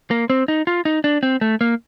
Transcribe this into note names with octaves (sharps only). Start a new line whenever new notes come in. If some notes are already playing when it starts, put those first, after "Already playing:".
A#3
C4
D#4
F4
D#4
D4
C4
A3
A#3